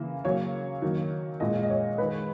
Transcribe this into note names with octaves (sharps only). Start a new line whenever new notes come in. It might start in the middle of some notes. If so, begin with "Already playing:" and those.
Already playing: C#3 E3 A#3
C#3 F#3 A#3 C#5
D#3 F#3 A#3
A#2 G#3 D#5
D#5
C#5
D#3 G#3 B4